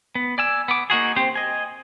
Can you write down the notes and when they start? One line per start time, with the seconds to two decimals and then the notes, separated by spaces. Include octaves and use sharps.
0.15 B3
0.38 D5 G#5 E6
0.68 B3 D6
0.90 A#3 D#4 F#4 G#4
1.16 C4 G4 C5
1.36 D#5 G#5